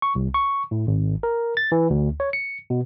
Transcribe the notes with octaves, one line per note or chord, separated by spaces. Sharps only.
C#6
C2
C#6
A2
G#1
A#4
A6
E3
D2
C#5
C#7
B2